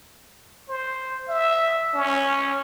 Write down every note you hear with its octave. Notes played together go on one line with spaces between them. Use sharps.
C5
E5
C#4